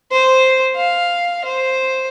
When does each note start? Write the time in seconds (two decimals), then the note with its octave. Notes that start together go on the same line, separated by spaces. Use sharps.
0.12 C5
0.76 F5
1.45 C5